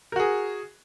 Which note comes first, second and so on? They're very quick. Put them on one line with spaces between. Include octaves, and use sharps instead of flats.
A#4 F#4 G#4